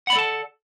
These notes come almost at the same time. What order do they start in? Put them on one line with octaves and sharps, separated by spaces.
F#5 B5 D5 A4 A5